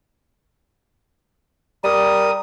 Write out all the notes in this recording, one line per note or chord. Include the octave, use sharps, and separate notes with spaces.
G3 A#4 D#6